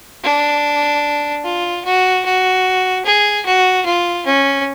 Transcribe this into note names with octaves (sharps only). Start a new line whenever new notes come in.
D4
F4
F#4
F#4
G#4
F#4
F4
C#4